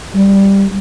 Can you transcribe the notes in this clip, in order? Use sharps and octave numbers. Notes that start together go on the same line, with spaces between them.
G3